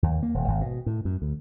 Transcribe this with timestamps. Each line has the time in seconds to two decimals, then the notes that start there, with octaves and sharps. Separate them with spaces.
0.03 D#2
0.23 A#3
0.34 D#1
0.48 G#1
0.61 B2
0.86 A2
1.05 F#2
1.22 D2